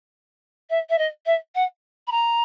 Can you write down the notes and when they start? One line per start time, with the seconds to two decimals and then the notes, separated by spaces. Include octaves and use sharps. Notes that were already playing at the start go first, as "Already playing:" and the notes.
0.70 E5
0.90 E5
0.98 D#5
1.26 E5
1.55 F#5
2.07 B5
2.11 A#5